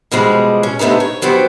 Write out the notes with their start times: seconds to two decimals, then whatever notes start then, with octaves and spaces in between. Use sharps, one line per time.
0.11 B2 F3 G3 G#3
0.63 C#4
0.79 C3 A3 B3 D4 D#4
1.00 C#5
1.22 F3 F#3 B3 G4 C5